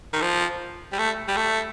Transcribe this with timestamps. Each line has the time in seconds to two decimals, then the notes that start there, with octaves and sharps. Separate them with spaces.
0.13 D#3
0.22 F3
0.92 G3
0.99 A3
1.28 G3
1.36 A3